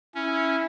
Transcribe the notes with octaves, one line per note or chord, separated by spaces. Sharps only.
C#4 E4